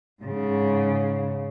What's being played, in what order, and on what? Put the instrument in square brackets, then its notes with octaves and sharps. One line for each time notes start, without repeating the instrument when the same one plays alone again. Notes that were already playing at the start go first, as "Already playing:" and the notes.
[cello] G#2 C#3